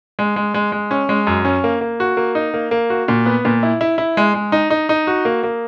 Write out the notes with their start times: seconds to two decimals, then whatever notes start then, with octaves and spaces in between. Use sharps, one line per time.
0.19 G#3
0.36 G#3
0.54 G#3
0.72 G#3
0.91 C#4
1.09 G#3
1.27 F#2
1.45 C#4
1.64 A#3
1.81 A#3
2.00 F#4
2.17 A#3
2.35 D#4
2.54 A#3
2.71 A#3
2.90 F#4
3.08 A#2
3.26 B3
3.45 A#2
3.63 E4
3.81 E4
3.98 E4
4.17 G#3
4.34 G#3
4.52 D#4
4.70 D#4
4.89 D#4
5.07 F#4
5.25 A#3
5.43 A#3